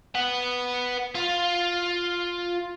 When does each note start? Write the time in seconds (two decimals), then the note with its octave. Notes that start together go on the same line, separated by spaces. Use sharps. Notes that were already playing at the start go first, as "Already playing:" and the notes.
0.15 B4 F#5
1.15 F4